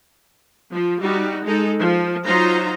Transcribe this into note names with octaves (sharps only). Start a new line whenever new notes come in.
F3
G3 D#4 F#4
G#3 D#4 A4
F3
F#3 D#4 F4 C5 A#5